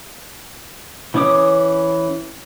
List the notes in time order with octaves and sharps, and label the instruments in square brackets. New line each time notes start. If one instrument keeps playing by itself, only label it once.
[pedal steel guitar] E3 C#4 C#5 D6 D#6